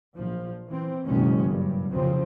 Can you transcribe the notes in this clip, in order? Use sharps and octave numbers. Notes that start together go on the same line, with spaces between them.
A#1 F3
E3 C4
F#1 B1 B2 D#3 G#3 C#4
G2
C2 F2 C#3 F3 C4